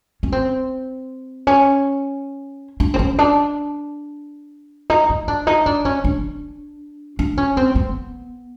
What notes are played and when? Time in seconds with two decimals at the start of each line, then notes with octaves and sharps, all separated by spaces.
0.23 C#4
0.32 C4
1.47 C#4
2.80 D4
2.94 C4
2.99 C#4
3.19 D4
4.90 D#4
5.09 D#4
5.28 D4
5.47 D#4
5.66 D4
5.85 C#4
6.04 D4
7.19 D4
7.37 C#4
7.57 C4
7.75 B3